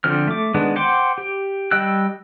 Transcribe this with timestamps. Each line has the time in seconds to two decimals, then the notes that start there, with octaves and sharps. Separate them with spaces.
0.04 D3 F3 C4 F6
0.28 A3 D6
0.54 D#3 G#3 B3 D4
0.76 C5 F#5 G5 C6 D6
1.18 G4
1.71 G3 D#5 G5 E6 F#6